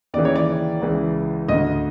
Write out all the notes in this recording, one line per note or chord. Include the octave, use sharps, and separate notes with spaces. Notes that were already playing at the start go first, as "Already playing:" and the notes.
D#2 C#3 E3 D5
C#5
D5
C#2 C#3 E3
D2 D3 D#5